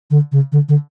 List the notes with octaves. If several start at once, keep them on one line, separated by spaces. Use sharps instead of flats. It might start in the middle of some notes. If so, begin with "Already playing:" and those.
D3
C#3
D3
D3